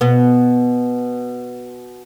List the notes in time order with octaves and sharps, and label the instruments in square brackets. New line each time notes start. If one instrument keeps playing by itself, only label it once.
[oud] B2 B3